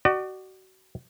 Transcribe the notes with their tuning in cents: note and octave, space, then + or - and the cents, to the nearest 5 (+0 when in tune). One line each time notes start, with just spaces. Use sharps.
F#4 +30 D5 +40